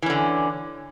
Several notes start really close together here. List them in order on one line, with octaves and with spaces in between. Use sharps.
E3 C#4 D3